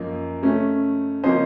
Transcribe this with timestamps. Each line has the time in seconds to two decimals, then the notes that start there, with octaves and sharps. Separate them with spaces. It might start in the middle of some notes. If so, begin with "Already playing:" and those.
Already playing: F#2 F3 A#3 D#5
0.43 C#3 A3 C#4
1.24 C#3 F3 A#3 C#4 C5 D#5